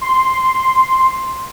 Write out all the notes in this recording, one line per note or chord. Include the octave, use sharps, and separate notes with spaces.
C6